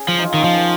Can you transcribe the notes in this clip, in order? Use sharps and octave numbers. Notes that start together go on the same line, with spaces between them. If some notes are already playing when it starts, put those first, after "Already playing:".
Already playing: C#4 G#4
F3
D#4 F4
D#3
F3 C#4
D#3